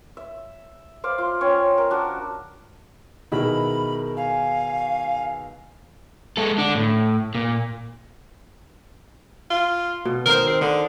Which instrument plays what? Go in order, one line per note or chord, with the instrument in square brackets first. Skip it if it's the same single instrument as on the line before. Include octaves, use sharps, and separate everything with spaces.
[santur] E5
C5 D5 F5
F4
C#4 C5 C#5 G5
A#4
D4 F#4
[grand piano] B2 D#3 E4 [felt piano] G#4 D#5 [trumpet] A#4 [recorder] B5
[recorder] F5 [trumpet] G#5
[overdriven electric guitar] G#3 A4
D3 D4
A2
A#2
[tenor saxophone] F4
[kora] B2
[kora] D#3 D#4 C5 [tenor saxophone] A#4
[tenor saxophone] C4
[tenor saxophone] D3 [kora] D#5